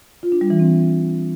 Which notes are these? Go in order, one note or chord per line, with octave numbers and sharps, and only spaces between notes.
F4
D4
G3
E3
C4